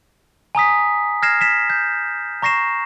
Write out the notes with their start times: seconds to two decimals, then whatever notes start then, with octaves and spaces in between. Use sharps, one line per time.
0.55 G#5 A#5 D#6 B6
1.22 F6 G#6 A#6 C7 E7
1.41 B6 E7
1.70 G6
2.42 A#5 C#6 A#6 C7 E7